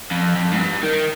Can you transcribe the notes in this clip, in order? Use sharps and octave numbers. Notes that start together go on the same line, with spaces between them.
F2
F2
G#2
G2
D#3